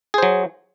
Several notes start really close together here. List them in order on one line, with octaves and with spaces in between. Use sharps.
G#4 C5 F#3